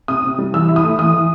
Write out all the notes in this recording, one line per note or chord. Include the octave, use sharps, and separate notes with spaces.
C3 D#6
C3
G3
E3 E6
E4
D#6
A3
E3 D#6
E3